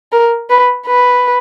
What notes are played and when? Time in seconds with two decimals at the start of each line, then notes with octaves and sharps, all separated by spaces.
0.12 A#4
0.50 B4
0.86 B4